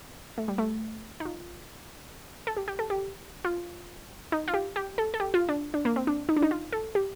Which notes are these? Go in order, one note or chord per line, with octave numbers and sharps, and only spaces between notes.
A3
G3
A3
D#4
F4
A4
G4
G4
A4
G4
F4
D#4
F4
G4
G4
A4
A4
G4
F4
D4
D4
A#3
C4
D4
D#4
D4
D#4
F4
A4
G4